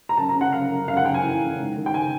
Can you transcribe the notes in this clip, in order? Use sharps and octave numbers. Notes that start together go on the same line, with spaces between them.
A#5
F#2 A5
A#5
C#3
F#5
F#2 F5
F#2
F#2 F5
F#5
F#2 G5
G#5
E3
C#3
G#2
D#3
G5
G#5